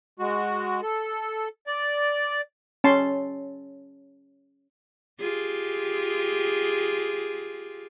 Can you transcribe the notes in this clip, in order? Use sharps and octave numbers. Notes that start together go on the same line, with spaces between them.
G#3 F#4
A4
D5
C#4 A5 C6
F4 G4 G#4